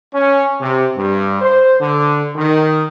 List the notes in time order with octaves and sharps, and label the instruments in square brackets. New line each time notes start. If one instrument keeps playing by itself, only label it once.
[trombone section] C#4
C3
G2
C5
D3
D#3